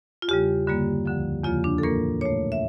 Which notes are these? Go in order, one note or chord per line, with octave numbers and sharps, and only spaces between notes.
F4
E2 C#3 G3 G4
G2 D3 G3 A#3
D2 D3 F3
E2 C#3 F3 A#3 F4
D4
A4
A2 E3 A#3 A#4
A#2 A3 C#5
E5